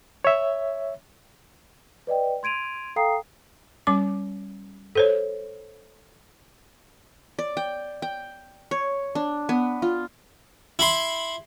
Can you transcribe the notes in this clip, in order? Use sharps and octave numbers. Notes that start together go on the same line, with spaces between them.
C#5 E5
B4 D5 D#5 G5
C6 G#6 D7 D#7 F7
A4 F5 G5 A#5 D#6 C7
G3 C#4 D6
A4 C5 C#5
D5
G5
G5
C#5
D4
B3
F4
E4 B5 C6